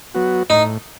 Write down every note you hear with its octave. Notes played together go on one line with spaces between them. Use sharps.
F#3 B3 F#4
A2 D#4